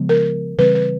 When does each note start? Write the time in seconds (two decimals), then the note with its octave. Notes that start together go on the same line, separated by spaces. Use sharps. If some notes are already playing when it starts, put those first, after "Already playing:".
Already playing: C#3 F3 G#3 B3
0.09 A#4
0.58 C#3 E3 G3 C4 B4
0.75 B4